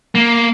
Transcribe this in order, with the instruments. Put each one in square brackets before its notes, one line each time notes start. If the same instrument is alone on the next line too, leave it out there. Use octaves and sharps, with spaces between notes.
[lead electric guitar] A#3